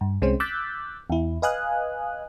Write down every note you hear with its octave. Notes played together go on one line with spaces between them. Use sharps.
G2
C2 G#3 C4 C#4 C5
D6 E6 F#6 G6 A6 B6
E2 E4
B4 D#5 F5 G#5 D#6 F#6